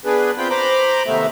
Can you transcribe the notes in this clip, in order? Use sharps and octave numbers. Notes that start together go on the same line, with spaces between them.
B3 D4 G#4 B4
C4 F4 G5 B5
C5 A#5 B5 D6
D#2 C3 A3 B3 E5